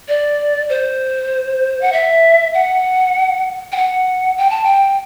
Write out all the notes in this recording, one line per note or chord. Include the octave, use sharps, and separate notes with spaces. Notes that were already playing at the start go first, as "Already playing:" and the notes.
D5
C5
F#5
E5
F#5
G5
F#5
G5
A5
G5